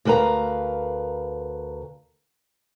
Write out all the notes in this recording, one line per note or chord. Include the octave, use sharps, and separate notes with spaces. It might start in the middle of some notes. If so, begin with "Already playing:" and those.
D2 A#4 B4 F5 A#5